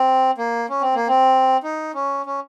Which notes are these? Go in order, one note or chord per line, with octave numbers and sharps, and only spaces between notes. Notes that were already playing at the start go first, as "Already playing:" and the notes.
Already playing: C4
A#3
C#4
C4
A#3
C4
D#4
C#4
C#4